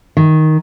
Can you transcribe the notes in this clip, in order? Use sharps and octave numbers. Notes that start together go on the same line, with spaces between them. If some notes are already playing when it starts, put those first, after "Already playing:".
D#3